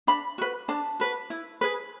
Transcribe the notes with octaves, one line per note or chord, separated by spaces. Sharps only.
D4 B5
F#4 B4
D4 A5
F#4 B4
E4
G#4 B4